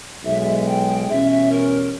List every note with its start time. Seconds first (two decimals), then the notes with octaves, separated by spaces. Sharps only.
0.23 B1 B2 G#3 E5
0.66 G5
1.09 E2 B2 G3 C#4 E5
1.29 E5
1.50 A#4